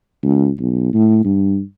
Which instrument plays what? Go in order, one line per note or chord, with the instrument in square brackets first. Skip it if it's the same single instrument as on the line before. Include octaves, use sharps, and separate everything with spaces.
[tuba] C#2
B1
A2
G2